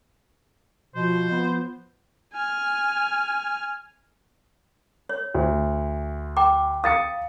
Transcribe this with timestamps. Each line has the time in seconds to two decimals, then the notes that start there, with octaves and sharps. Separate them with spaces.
0.95 B2 F3 C5
1.32 B3
2.33 G#5 F6
5.09 C#5
5.34 D2
6.37 G5 A#5 D6
6.84 F5 A#5 D#6 A6 C#7